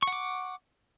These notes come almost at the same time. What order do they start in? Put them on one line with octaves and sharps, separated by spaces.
C#6 F#5 D6